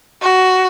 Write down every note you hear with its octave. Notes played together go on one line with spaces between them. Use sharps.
F#4